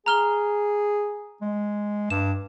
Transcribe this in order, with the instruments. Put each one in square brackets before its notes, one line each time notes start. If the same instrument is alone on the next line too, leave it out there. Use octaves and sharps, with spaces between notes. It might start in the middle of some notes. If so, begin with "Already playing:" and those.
[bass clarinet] G#4 [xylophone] A#5 F6 G7
[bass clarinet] G#3
[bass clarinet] G2 [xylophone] E7